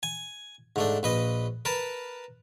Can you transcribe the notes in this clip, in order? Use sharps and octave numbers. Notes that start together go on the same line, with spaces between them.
G#5
G#2 A3 D4
A#1 B4 D#5
A#4 B4 A5